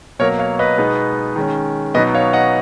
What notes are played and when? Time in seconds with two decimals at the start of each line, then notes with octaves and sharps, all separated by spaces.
0.19 B2 F#3 A#3 A#4 C#5
0.39 C#5 F5
0.59 B4 D#5
0.78 B2 G#3 B3 D#4
1.36 D#3 G#3 C#4
1.94 B2 F#3 B3 D#4 B4 D#5
2.14 C#5 F5
2.33 D#5 F#5